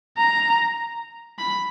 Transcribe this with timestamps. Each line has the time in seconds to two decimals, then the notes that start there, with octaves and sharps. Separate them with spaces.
0.18 A#5
1.39 B5